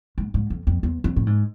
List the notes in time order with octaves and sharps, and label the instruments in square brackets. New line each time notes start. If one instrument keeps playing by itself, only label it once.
[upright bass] G#2
G#2
F2
F2
E2
F2
A2
G#2